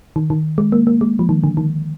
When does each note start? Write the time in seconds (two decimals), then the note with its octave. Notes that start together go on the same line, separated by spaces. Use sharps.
0.16 D#3
0.30 D#3
0.58 G#3
0.72 A#3
0.87 A#3
1.01 G#3
1.19 F3
1.29 D#3
1.44 D3
1.57 D#3